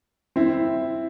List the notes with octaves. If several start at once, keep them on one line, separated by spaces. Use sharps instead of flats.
C4 E4